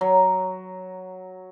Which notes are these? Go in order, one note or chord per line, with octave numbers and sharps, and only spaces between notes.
F#3